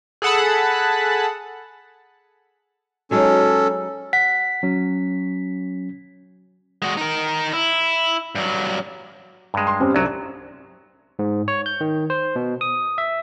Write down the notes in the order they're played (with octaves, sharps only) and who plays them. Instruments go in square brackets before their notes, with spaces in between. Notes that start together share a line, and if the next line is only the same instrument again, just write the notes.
[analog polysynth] G#4 A4 F#5 A5 B5
[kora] F#3 G#3 D#4 [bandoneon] C#4 A4
[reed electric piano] F#5 [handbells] B6
[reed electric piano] F#3 C#4
[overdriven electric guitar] G#3 F#4
D#4 A#4
E4
G2 F#3
[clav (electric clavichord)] G2 G#3
[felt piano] C6
C4 C#4 G4
[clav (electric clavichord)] C2 F#3 [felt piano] D4
[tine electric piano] G#2
C#5
G6
D#3
C5
B2
D#6
E5